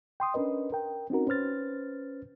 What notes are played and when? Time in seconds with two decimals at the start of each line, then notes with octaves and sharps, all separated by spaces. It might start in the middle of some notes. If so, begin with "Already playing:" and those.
0.20 G5 C6 D#6
0.34 C#4 D4 A#4 B4 D#5
0.72 A#4 G5
1.10 C4 C#4 D#4 F#4 A#4
1.27 C#4 B4 C5 F6 A6